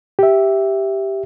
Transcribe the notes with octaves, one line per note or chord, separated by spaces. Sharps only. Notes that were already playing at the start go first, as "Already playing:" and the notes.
G4 E5